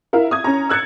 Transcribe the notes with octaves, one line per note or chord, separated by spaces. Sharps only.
E4 A#4 E5 F5
D#6 G#6
C#4 A#5
E6 F#6 G#6 A6 C#7